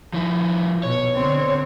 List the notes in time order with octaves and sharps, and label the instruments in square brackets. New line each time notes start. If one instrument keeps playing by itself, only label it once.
[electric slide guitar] F3 E4
[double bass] B2 [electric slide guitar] C#5
[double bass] D3 C4